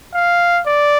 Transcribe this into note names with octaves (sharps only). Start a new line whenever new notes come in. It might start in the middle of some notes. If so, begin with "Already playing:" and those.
F5
D5